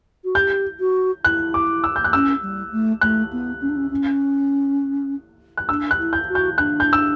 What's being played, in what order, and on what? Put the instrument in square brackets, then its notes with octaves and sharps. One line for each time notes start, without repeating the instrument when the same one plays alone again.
[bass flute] F#4
[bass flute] G4 [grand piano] G6
[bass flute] F#4
[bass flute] E4 [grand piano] F#6
[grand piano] D6
E6
G6
F#6
[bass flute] C#4 [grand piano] E6
[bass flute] G3
A3
[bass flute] A3 [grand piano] F#6
[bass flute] B3
C#4
D4
C#4
C#4
[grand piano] F#6
[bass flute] D4 [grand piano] E6
[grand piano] F#6
[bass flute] E4
[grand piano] G6
[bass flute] F#4
[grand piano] G6
[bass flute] D4 [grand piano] F#6
[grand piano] G6
E6